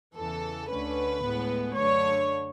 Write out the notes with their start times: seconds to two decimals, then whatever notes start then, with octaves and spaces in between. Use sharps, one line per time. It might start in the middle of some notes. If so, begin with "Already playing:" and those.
0.15 E2 C#3 E3 A4
0.70 D2 D3 A3 C#4 B4
1.23 A2 G#3 B3
1.77 F#2 D3 A3 C#5